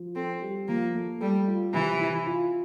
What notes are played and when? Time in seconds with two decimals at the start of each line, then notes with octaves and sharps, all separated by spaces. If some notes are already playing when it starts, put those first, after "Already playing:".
Already playing: F3
0.15 C4 A4
0.41 G3
0.68 F3 A#3
0.95 A3
1.21 G3 A4
1.48 F4
1.74 C3 E3
2.01 E4
2.27 F4